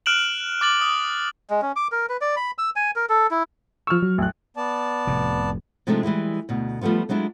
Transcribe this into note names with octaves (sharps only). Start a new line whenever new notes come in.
F6 F#6 D7 E7 F#7
D6 A6 F#7
D#6
G#3
C#4
D6
A#4
B4
D5
B5
E6
G#5
A#4
A4
E4
F3 C#6 E6 F6
F#3
A1 F#6
B3 D5 A5
F1 A2 C3
C3 F3 G#3 A3 D4 D#4
E3 G3 G#3 E4
D2 B2
F3 G3 A3 B3 F4
F#3 G#3 D4 E4 F4